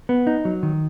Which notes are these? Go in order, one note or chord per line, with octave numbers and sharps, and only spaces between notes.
B3
D#4
F#3
D#3